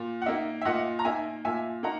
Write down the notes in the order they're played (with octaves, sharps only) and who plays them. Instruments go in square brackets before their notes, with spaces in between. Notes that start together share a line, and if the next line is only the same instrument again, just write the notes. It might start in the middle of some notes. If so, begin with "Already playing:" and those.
Already playing: [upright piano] A#2
F#5
A#3 D#4 E5
E5
A#2 D#5 F#5
A#5
A#3 D#4 E5 G#5
A#2 E5 G#5
A#3 D#4 F#5 A#5